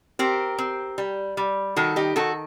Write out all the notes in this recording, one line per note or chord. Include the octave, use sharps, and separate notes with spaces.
C4 G4 A#4
C4
G3
G3
D#3 F#4 A4
D#4 G4
D#3 F#4 A4